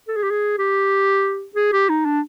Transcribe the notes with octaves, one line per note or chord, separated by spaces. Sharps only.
A4
G#4
G4
G#4
G4
G#4
G4
D#4
D4